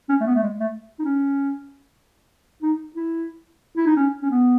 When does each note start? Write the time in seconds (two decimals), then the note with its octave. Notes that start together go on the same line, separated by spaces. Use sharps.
0.09 C#4
0.21 A3
0.27 B3
0.35 A3
0.43 G#3
0.60 A3
0.99 D#4
1.05 C#4
2.62 D#4
2.96 E4
3.77 E4
3.87 D#4
3.96 C#4
4.22 C#4
4.31 B3